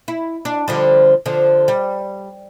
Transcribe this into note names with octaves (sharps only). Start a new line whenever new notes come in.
E4
D4
D3 F3 G3
D3 F3
G3